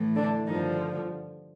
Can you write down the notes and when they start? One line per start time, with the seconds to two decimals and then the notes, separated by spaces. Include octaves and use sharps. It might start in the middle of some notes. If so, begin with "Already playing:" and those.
Already playing: A2 E3
0.16 D3 D4
0.47 G2 D3 D#3 F3 D#4